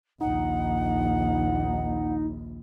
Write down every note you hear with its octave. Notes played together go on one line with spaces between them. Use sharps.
A#1 D#2 D#4 F#5